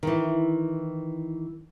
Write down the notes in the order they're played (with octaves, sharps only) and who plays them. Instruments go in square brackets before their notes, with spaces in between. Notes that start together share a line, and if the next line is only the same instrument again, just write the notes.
[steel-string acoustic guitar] D#3 E3